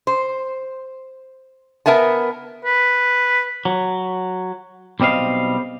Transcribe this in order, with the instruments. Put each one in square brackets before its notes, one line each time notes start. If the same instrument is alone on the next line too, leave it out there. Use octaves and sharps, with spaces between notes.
[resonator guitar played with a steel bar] C5
B3 A#4 E5 G#5 A5
[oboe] B4
[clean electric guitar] F#3
B1 G3 C4 D#5 F5